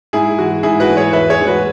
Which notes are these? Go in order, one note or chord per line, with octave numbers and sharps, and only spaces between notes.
G#2 E4 G#4
E3 G#3 F#4
G#2 E4 G#4
F#4 B4
E3 G#3
G#4 C#5
E2 B4 E5
G#4 C#5
E3 G#3
F#4 B4